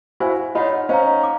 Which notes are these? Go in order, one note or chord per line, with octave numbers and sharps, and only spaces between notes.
E4 F#4 C5 F5 G#5
D#4 F4 C#5 F#5 B5
C#4 D#4 C5 F5 A#5
D6